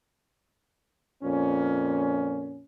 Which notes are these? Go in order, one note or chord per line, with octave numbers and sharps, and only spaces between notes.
F2 A#2 C#4